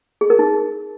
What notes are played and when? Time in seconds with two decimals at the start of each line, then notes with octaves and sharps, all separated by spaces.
0.21 G#4
0.30 A#4
0.39 D#4